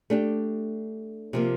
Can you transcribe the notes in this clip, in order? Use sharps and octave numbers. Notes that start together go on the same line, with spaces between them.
A3 D4 G4
C3 F3 A#3